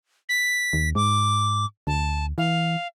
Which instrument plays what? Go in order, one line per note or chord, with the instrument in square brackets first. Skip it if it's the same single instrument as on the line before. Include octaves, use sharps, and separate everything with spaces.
[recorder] B6
[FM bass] D#2
[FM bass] G#2 [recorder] D6
[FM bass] D2 [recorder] A5
[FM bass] E3 [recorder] F5